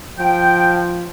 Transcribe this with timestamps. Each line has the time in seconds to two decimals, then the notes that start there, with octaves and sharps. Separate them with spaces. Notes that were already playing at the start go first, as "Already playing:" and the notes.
0.18 F3 G5